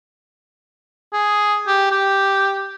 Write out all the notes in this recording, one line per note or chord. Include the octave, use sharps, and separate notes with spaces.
G#4
G4
G4